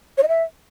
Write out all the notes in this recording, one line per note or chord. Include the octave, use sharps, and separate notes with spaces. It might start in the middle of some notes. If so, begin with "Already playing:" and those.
C#5
D#5
E5